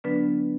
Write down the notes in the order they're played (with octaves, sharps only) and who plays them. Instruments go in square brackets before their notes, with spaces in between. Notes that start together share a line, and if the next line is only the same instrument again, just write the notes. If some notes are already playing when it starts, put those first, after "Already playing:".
[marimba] D3 F#3 B3 D4 B4